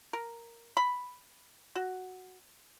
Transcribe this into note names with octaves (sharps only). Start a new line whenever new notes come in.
A#4
B5
F#4